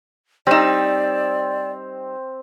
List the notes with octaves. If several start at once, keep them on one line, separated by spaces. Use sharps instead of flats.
G3 C4 D#4 D5 E6